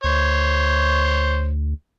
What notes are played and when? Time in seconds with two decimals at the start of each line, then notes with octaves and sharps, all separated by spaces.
0.04 D2 C5 C#5